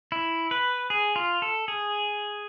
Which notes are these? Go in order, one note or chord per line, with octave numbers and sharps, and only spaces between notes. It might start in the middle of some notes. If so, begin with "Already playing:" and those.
E4
B4
G#4
F4
A4
G#4